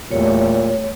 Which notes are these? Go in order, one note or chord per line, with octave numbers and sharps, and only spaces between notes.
E2 A#2 G3 A3 C#5